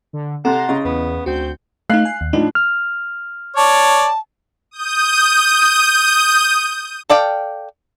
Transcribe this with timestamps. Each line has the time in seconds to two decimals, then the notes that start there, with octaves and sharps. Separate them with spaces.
0.13 D3
0.45 C3 A4 F#5 A#5 C6 A6
0.69 C#3 D#5
0.85 E2 B3
1.26 D2 C4 F#4 G6
1.90 A3 D#4 F5 F#6 C7
2.05 G#5
2.21 D#2
2.33 A2 F3 D4 D#4
2.55 F6
3.57 C#5 D5 A5
4.71 D#6 G6 D#7
7.10 A4 D5 F5 G5